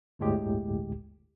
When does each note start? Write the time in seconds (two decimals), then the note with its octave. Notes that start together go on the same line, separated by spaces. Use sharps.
0.19 G1 D2 A2 G#3 G4